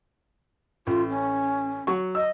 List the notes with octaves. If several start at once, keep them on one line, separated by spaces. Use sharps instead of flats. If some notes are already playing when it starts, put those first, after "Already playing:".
A1 F4
C#4
F#3 C#6
D#5 E6